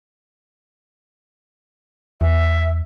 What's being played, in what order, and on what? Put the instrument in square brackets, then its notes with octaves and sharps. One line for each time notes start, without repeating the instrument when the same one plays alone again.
[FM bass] E2 [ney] E5